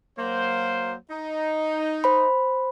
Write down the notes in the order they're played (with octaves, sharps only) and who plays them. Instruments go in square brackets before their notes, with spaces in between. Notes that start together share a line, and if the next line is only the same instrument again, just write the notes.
[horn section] F#3 A#3 C5
D#4
[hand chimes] C5 B5